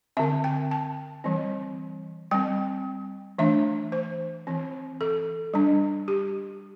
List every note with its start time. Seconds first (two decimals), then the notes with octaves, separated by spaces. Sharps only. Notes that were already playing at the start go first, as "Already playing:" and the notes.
0.17 D3 C4 E5
0.44 G5
0.71 A5
1.24 E3 G3 C4
2.31 G3 C4 G5
3.38 E3 A3 D4 E5
3.92 C5
4.47 E3 C4
5.01 A4
5.54 G3 D4
6.08 G4